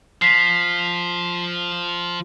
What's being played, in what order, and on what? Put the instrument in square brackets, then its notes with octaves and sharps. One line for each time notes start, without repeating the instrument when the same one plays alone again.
[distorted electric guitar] F3 [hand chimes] B6 C7